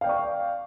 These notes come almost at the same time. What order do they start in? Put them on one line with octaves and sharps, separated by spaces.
F5 G5 D5 C#6